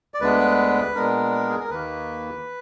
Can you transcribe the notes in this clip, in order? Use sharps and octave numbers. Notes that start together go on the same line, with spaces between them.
D5
D2 D3 G#3 B3 D4 B4
A#2 G#3 B3 D4 A#4
G#4
A#4
D#2 D#3 A#3 B4